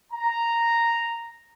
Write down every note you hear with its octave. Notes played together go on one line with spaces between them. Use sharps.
A#5